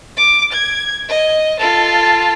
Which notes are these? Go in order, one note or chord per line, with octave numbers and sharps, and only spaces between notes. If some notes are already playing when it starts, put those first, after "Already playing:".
D6
G#6
D#5
F4 A4